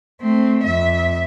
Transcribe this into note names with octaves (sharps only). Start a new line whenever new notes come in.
A3 C4
F2 E5